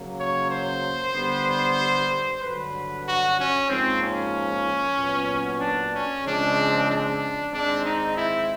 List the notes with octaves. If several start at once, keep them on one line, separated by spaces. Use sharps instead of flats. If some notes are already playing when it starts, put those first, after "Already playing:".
Already playing: C#3 F#3 A#3
C#5
C5
D3 G3 B3
G2 D3 F#3 B4
F#4
C#4
G#2 F3 A#3 C4
C#4
A#2 F#3 B3
D4
C#4
C#3 F3 G#3 C4 D4
D4
G#2 D#3 G#3 C4 D4
D#4
E4